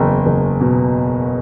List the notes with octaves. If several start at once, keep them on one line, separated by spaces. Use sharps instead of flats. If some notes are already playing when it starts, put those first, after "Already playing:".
Already playing: F#1 E2 G5
F#1
B2